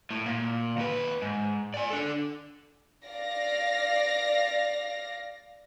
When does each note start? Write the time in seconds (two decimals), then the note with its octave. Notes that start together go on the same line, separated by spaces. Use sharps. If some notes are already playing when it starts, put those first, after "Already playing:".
0.11 A2
0.26 A#2
0.77 D#2 B4
1.22 G#2
1.74 D5 G#5
1.90 D4 A4
3.06 D5 F5 A#6